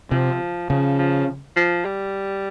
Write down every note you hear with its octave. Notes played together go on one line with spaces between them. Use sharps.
C3 F3
C#3 F3
F3
F3
G3